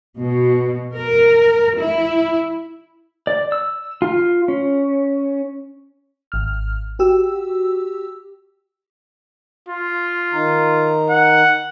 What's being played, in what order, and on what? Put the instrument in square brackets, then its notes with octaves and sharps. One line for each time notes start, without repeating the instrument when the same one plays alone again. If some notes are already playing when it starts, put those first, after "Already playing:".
[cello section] B2
A#4
E4
[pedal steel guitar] D5
E6
F4
C#4
[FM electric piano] G#1 F6
F#4 G4 E6
[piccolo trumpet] F4
[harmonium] D#3 D#4 A#5
[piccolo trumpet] F#5